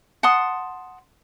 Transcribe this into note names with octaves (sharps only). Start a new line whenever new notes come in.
F#5 A5 C6 D#6